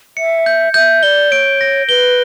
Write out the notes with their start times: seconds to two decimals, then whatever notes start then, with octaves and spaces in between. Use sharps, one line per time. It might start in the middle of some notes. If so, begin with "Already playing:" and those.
0.17 E5 C#7
0.46 G6
0.74 E5 G6
1.03 D5 G7
1.31 C#5 D7
1.61 A#6
1.89 B4 G7